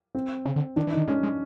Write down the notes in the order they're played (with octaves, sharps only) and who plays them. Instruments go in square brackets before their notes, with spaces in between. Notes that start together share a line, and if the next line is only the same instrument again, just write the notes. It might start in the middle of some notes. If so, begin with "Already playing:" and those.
[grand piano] C4
[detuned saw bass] C#3
D3
[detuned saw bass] D#3 [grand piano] D4
[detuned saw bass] E3
[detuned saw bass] D#3 [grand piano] D#4
[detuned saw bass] G#3 [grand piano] C#4
[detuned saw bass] G#3